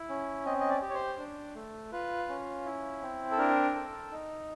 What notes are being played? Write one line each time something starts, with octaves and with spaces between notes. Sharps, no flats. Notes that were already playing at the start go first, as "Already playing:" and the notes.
Already playing: E4
C#4
C4 D#5
D#5
D5
G4
C#5
C5
D4
A3
F4 B4
C#4
E4
C4
A4
D4 A#4
A4
D#4